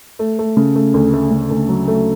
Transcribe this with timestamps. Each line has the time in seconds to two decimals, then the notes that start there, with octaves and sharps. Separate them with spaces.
0.19 A3
0.39 A3
0.57 C#3
0.76 A3
0.94 D2
1.13 A3
1.31 C#3
1.51 D2
1.69 F#3
1.88 A3